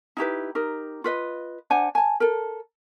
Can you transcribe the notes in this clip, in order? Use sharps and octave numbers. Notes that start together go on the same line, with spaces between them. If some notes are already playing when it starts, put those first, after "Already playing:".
D#4 E4 G4 B4
D#4 G4 A#4
F4 B4 D#5
D4 C5 F#5 G#5
G#5 A5
A4 A#4